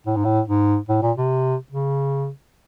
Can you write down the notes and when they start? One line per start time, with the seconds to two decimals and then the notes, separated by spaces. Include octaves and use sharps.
0.06 A2
0.16 G#2
0.25 A2
0.48 G#2
0.89 A2
1.02 A#2
1.17 C3
1.72 C#3